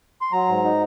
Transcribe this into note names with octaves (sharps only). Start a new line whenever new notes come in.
C6
F#3 A#5
G#2
D#4